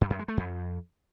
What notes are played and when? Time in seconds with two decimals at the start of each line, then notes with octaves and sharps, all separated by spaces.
0.01 G2
0.10 F#2
0.19 G#3
0.28 A3
0.37 F2